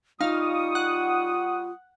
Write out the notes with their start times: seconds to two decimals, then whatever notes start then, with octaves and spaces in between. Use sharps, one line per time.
0.21 G3 D#4 F4 F5 C#6 D#6
0.75 F#5